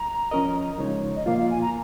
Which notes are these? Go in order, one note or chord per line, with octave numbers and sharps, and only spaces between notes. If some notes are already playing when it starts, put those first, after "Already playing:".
Already playing: A#5
F3 C#4 A#4 D#5
C#3 F3 G#3 D#4 C#5
D#5
A#2 F3 A#3 F4 F5
F5
G#5
A#5